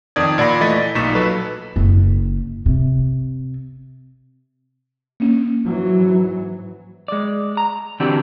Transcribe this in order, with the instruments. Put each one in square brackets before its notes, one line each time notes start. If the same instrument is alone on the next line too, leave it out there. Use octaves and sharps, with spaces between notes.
[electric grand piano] F2 D#3 D5 D#6 G#6
A#2 D5 F#5 B5 A#6
E3 A3 D#5 A6 B6
D5
B1 A#2 D#4 C#6 B6 E7
F#3 A4 B4
[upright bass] F#1
C3
[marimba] A#3 C#4
[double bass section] G#2 E3 F#3
[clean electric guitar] G#3 D5
A#5
D3 E3 C4 D4 F#4 G4